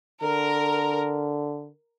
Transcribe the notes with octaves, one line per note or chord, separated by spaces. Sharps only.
D3 A#4